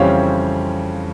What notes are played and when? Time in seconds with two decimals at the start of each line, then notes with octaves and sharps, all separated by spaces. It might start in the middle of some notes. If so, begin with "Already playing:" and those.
Already playing: F2 C#3 E3 G3 C4 C#5 F5